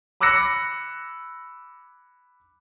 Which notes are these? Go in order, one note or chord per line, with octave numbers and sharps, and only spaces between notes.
B5 D6 E6 F#6 A#6 C#7